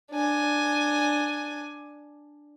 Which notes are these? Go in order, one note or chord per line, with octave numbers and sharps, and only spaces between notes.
D4 G#5